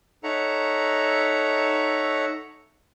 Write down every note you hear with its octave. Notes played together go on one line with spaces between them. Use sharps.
D#4 A4 C#5 E5 F#5 A#5